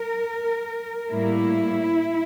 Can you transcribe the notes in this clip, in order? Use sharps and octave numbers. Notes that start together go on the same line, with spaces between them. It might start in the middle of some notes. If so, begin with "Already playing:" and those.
Already playing: A#4
A2 G3 A#3 E4